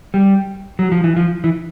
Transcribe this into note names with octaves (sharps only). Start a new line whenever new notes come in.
G3
F#3
F3
E3
F3
E3